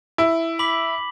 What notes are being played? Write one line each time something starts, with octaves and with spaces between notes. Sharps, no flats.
E4
B5 D6 B6 F#7